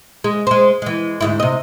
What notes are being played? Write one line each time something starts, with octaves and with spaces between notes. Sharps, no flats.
G#3
G#3 C5
E3 G#3
D2 G#2 E4
C3 D#5